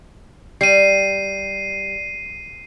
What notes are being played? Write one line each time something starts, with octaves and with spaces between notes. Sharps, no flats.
G3 C7 D#7